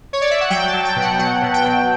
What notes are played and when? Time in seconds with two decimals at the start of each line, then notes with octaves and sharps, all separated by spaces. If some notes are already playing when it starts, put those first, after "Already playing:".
0.13 C#5
0.22 D5
0.31 E5
0.41 F#5
0.50 F#3 G5
0.68 A5
0.73 F#3
0.85 G5
0.96 B2
1.02 F#5
1.19 F#3 F#5
1.42 B2
1.54 G5
1.65 F#3